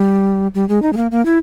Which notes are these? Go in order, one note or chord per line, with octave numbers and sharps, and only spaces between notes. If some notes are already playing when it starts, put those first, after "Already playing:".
Already playing: G3
G3
G#3
D#4
G#3
A#3
A#3
E4